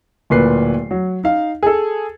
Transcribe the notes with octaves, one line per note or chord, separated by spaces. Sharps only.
D1 A#2 B4 C7
F#3
D#4 F5
G#4 A4